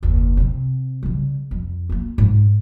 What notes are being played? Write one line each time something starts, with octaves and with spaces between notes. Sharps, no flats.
F#1 D#2
C3 C4
C#3 G3
F2
A#3 F4
G#2